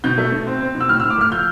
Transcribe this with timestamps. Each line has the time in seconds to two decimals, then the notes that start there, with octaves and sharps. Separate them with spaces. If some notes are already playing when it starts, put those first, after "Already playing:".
0.04 B2 G6
0.18 A3
0.32 B2
0.47 C4
0.61 C4
0.75 B2
0.80 E6
0.89 A2 F6
1.00 E6
1.04 A2
1.10 D6
1.18 A3 F6
1.32 F3 G6